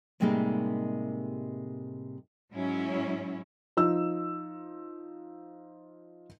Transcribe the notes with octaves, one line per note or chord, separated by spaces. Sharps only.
A2 C3 G3 G#3 A#3 D#4
G#2 F#3 C#4 E4
F3 D#4 E6